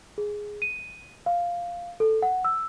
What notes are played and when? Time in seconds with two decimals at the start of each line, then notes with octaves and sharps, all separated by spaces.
0.18 G#4
0.62 D#7
1.26 F5
2.00 A4
2.22 F#5
2.45 E6